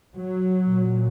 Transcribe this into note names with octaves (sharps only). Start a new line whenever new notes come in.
F#3
A#2